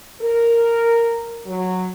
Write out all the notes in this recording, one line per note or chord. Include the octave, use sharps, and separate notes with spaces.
A#4
F#3